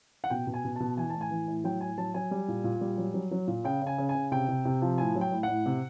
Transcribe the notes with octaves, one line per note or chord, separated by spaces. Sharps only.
F#5
B2 G5
B2
G#5
B2
B2 A5
E3 G#5
A2 A5
G#5
E3
A2
F#3 G5
A2 G#5
F#3 A5
F#3 G#5
G3
A#2
A#2
G3
F#3
F#3
F#3
A#2
C#3 G5
C#3 G#5
C#3
G#5
C#3
C3 G5
C3
C3
F3
A2 G#5
F#3
G5
A2
A2 F#5
C3